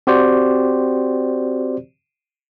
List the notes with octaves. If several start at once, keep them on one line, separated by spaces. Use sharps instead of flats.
C4 F#4 G4 C5 D5